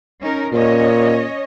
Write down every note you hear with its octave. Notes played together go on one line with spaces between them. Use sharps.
C#4 D#4 A#4
A#2 C#4 C#5 D#5